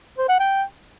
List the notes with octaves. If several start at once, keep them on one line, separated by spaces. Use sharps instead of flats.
C5
F#5
G5